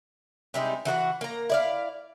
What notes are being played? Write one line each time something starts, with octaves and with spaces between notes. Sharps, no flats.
C3 G3 G#3 D#4
E3 F#4 A4 F#5
A#3 A#5
E4 D5 F5